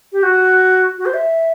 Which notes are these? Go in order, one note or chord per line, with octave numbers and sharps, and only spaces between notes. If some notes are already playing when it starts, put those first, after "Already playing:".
G4
F#4
F#4
C5
E5